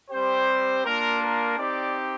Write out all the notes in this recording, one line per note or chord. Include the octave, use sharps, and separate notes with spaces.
G3 C4 G4 C5
A#3 D4 F4 A#4
A#4
C4 D#4 G4 D5